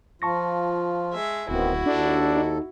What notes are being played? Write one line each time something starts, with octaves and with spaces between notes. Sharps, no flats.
F3 F4 A5 C#6 A#6
G#3 E5
D1 D#3 B3 C4 E4 F#4
D#2 D4 A4
D#4